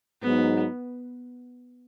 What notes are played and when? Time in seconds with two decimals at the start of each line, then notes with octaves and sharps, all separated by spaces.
0.22 G#2 F#3 B3 D#4